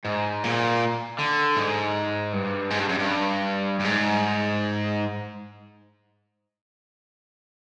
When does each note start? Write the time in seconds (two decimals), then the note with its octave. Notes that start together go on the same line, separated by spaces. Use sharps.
0.05 G#2
0.43 A#2
1.19 D3
1.56 G#2
2.33 G2
2.71 G#2
2.80 G2
2.89 F#2
2.99 G2
3.80 G2
3.84 G#2